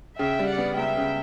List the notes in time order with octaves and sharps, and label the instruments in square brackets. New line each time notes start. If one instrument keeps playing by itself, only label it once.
[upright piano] C#3 [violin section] E5 G5
[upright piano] G3
[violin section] D5 F#5
[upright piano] B3
[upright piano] C#2 [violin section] E5 G5
[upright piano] C#3